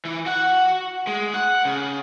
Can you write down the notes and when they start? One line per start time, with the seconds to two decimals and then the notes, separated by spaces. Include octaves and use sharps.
0.05 E3
0.26 F#4 F#5
1.07 G#3
1.34 F#5
1.65 C#3